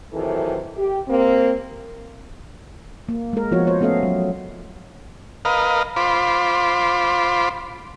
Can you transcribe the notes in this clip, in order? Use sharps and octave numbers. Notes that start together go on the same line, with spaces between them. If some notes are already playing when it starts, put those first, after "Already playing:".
C3 D#3 E3 F#3 A4
G4
A#3 C4
A#3
G#3 A#4
F3 B3 F4 F#4 C#5
C5 C#5
A3 B3 C#4 A4 D#5 F5
F#3
A#4 B4 D#5 F5
F4 C5 B5 D6